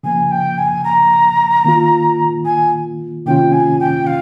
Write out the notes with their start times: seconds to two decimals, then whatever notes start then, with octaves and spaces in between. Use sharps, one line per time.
0.03 C#3 F3 A#3 G#5
0.31 G5
0.58 G#5
0.84 A#5
1.64 D#3 A#3 F4
2.44 G#5
3.26 C3 D#3 A#3 C#4 F4 G5
3.52 G#5
3.80 G5
4.06 F5